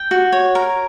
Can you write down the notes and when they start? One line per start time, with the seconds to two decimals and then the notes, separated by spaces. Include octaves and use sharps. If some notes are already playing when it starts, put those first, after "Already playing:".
Already playing: G5
0.11 F#4
0.32 C#5
0.55 A#4